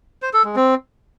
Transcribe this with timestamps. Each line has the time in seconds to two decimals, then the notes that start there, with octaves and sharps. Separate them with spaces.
0.22 C5
0.33 A4
0.45 G#3
0.56 C4